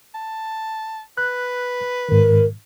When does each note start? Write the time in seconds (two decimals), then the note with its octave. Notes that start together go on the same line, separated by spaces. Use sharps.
0.14 A5
1.17 B4 F#6
2.09 G#2 D#3 A#4